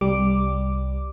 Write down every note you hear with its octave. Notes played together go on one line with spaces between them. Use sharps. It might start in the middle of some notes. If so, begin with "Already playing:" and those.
C2 G3 D6